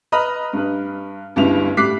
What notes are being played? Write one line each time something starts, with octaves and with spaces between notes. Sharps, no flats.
B4 D#5 A#5 B5 F6
G2 B4
G1 C#2 G2 G3 E4 F7
A2 G3 D6 F#6 B6 C7